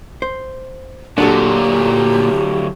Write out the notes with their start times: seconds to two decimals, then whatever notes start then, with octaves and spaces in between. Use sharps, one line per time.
0.22 C5
1.18 A#2 D3 F#3 D4 F#4 G4 A4